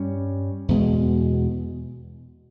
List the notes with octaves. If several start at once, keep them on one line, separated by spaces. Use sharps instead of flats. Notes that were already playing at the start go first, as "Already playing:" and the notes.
Already playing: G2 G3 C#4
E2 B2 G#3